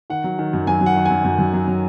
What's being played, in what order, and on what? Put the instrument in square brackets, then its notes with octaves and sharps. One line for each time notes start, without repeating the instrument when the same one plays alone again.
[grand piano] D#3 F#5
F#3
D#3
F#2
F#3 G#5
F#3
F#5
D#3
F#2 G#5
F#2
F#2
F#3
F#3